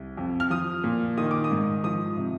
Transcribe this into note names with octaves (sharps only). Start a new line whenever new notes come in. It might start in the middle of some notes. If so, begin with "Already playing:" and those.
Already playing: C2
F2
F6
F3 D#6
A#2
D#3 D#6
D6
D#6
G#2
F3 D#6
C3